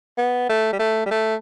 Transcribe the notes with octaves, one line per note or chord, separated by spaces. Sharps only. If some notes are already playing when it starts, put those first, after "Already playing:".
B3
A3
G3
A3
G3
A3